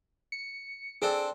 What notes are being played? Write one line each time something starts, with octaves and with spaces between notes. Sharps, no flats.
C#7
C4 D4 G#4 A4